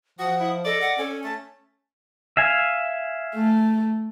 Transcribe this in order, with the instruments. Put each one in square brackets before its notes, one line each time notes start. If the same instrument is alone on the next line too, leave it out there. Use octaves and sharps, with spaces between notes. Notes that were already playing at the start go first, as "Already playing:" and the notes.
[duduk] F3 [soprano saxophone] F#4 [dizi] F#5 [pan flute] D#6
[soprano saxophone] E4
[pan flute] A4 [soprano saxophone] D5 [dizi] D#5
[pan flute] F#5
[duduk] C#4 [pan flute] A4 [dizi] G#5
[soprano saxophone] A3 [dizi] A5
[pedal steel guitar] E5 F5 G#5
[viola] A3